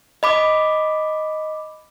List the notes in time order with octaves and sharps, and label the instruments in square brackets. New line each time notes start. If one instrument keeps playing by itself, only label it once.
[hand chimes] D#5 B5 D6